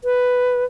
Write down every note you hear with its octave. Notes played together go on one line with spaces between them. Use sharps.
B4